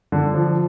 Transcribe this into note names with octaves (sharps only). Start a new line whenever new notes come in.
D3
F3